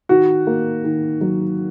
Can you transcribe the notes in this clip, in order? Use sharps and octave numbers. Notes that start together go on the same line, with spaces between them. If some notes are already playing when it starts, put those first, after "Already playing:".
D#3 F#4
A#3
D#3
F#3